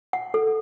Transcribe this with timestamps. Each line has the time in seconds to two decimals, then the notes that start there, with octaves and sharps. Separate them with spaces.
0.13 F#5
0.34 A4